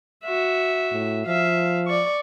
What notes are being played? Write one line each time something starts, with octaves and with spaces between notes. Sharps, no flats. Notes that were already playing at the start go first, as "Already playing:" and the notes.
F#4 E5
A2
F3 E5 F5
D5 C#6